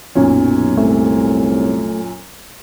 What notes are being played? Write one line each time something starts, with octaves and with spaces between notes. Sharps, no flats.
B1 F#2 A#2 C#4
C2 A3